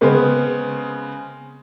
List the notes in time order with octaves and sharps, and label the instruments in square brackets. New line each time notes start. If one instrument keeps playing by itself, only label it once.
[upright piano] C#3 G#3 B3 C4 B4